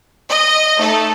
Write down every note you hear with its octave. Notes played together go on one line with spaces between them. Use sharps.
D#5
A3 D#4 A4